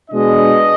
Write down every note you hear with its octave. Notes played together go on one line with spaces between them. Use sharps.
B2 G#3 B3 D4 D#5